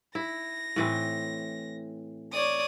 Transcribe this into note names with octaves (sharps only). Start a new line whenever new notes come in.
E4 A#6
A2 E3 C4
C#5 D5 D#6